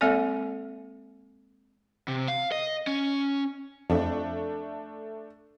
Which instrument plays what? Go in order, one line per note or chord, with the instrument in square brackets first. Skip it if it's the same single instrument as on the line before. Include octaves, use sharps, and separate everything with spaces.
[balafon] G#3 A#3 C4 A4 D5
[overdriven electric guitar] C3
F5
D#5
C#4
[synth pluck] F2 [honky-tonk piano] A3 D4